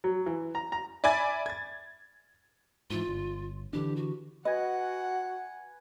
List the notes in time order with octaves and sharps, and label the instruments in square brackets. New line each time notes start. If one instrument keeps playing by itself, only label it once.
[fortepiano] F#3
E3
A#5
A#5
[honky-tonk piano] D5 E5 G#5 B5 G#6 A6
G#6 A6
[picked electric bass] G#2 E3 [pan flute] F4
[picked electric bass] G1
[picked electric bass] D3 E3 D4 [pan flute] G4
[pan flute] F#4
[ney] F#4 [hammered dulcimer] B4 G#5 [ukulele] D#5 [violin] F#5